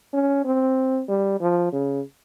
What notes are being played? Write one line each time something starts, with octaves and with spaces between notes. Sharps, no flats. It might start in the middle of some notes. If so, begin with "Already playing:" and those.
C#4
C4
G3
F3
C#3